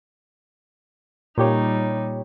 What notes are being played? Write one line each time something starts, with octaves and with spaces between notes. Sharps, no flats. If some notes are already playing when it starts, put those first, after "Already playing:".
A#2 G3 D#4 G4 C#5